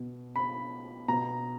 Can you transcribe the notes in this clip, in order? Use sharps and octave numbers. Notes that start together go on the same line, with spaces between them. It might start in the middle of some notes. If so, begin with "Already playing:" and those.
Already playing: B2
B5
B2 A#5